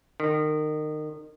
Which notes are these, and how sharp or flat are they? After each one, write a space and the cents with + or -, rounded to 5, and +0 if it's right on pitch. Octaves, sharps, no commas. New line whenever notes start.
D#3 -30